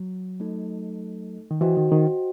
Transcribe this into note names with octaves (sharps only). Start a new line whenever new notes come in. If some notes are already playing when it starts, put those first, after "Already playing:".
Already playing: F#3
A3 D#4 A4
D#3
E3 F#4 C5 D#5 G5
D#3
D#3